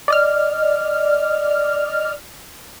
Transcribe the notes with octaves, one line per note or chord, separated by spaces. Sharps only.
D5 D#5 F6